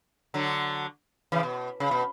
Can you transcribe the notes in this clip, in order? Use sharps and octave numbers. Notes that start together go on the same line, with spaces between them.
D3 F#3
C#3 E3
B2
C#3
B2